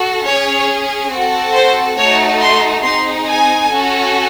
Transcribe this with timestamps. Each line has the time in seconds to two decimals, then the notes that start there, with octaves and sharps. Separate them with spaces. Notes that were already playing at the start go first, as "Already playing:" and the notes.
Already playing: F#4 A4
0.25 C#4 G#4 C#5
1.11 C4 F#4 A4
1.54 C5
1.97 A3 D#4 F#4 A4 C#5
2.40 C6
2.82 C4 D#4 G#4 C6
3.26 G#5
3.69 C#4 F#4 A4